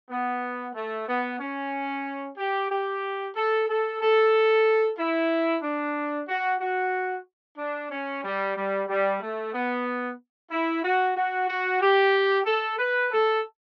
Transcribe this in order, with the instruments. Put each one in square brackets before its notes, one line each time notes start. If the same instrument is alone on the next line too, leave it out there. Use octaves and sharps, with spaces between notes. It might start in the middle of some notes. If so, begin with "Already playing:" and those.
[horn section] B3
A3
B3
C#4
G4
G4
A4
A4
A4
E4
D4
F#4
F#4
D4
C#4
G3
G3
G3
A3
B3
E4
F#4
F#4
F#4
G4
A4
B4
A4